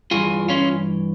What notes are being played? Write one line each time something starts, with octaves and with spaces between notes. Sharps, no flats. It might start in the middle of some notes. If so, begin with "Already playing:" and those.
G2 E3 F4 G#4
C#4 F4